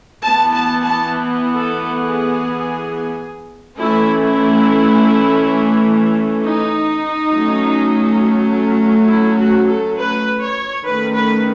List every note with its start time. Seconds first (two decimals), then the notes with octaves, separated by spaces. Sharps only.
0.23 E3 B3 A5
0.54 A5
0.83 A5
1.57 A4
2.01 G#4
3.78 E3 A3 C#4 E4
4.22 E4
6.43 D#4
7.31 F#3 A3 C#4
9.08 E4
9.37 F#4
9.67 A4
9.96 B4
10.40 C#5
10.85 D#3 A3 C#4 B4
11.14 B4